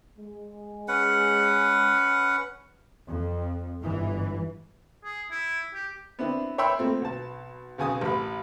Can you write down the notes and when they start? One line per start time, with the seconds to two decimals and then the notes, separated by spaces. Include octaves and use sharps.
0.18 G#3
0.88 C#4 B4 F#5
3.08 F2
3.82 G1 G#2 E3
5.04 G#4
5.31 E4
5.74 G4
6.19 B3 C4 D4 E4
6.58 C#5 E5 G5 B5 C6 E6
6.79 A#2 A3 C4
7.01 B1 A5
7.78 B1 C#3 G#5 D#6
8.01 A1 B5